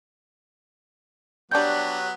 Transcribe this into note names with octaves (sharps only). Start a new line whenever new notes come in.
F#3 G3 B3 D4 G4 C#5 G6